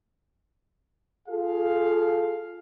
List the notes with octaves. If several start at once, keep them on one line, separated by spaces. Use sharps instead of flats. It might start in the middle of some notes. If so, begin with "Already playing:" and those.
F4 G#4 A4 F5